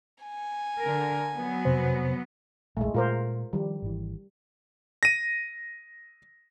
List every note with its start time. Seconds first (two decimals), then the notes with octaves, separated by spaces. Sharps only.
0.23 G#5
0.81 D3 A#4
1.35 F#3 B3
1.65 F2 C3 C5
2.77 E1 A#1 G#3 A3
2.94 A#2 G#3 F4 A#4 C5
3.53 D#3 F3 G3
3.82 G#1 E3
5.03 A#6 D#7